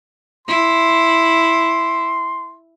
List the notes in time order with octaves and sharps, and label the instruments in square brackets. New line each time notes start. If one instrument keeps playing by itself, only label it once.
[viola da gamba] E4 [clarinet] C6